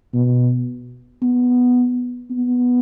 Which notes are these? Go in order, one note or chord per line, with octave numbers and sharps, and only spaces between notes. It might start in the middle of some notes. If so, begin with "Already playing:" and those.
B2
B3
B3